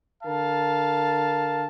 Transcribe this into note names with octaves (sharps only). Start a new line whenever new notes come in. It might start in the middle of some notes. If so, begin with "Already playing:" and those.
D3 A#4 F5 A5